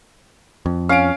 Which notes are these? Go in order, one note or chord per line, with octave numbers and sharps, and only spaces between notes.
F2
C#4 F5 D7